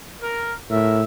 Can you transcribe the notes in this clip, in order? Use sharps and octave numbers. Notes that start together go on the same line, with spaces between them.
A#4
A2 A#4 E5